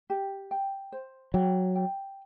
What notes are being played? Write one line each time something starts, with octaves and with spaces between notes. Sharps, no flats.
G4
G5
C5
F#3 G5
G5